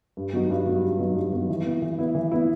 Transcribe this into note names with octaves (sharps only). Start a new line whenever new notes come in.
G2
F#3 B3 D#4 F#4
G2
F#3 B3 D#4 F#4
G2
F#3 B3 D#4 F#4
G2
F#3 B3 D#4 F#4
E3
B3 E4
E3
B3 E4
E3
B3 E4